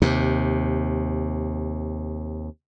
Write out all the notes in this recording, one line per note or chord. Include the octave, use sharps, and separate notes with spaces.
D#2 C3